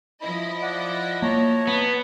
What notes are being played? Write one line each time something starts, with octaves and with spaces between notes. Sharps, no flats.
F3 E4 D#5 B5
D5 F#5
A#3 C#5 A5 A#5
B3